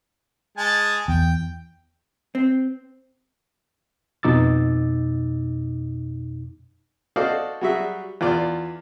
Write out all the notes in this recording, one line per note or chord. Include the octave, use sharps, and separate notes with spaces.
G#3 G#5 A5
E2 G5
C4
F2 B2 D#4 D6 E6 A6
F#4 A4 C5 D5 D#5 F5
F#3 G3 F#4 G#4 E5
E2 F4 D5